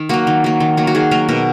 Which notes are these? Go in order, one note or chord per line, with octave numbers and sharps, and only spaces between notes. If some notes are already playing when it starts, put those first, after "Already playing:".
Already playing: D#3
F#3 A#3 F#4
D#3
F#3 A#3
D#3
F#3 A#3
F#4
D#3 G#4
F#3 A#3 A#4
B2 A#4